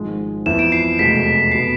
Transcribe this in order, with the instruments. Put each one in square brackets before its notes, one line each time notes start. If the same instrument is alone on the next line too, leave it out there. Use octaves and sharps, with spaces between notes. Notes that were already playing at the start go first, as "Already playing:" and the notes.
Already playing: [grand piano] G#1 G#2 F3 G#3
[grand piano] F2 E3 B3 E4 [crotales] E7
[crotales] D7
C7
[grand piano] F1 E2 B2 G#3 [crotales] B6
[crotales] C7
[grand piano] B2 B3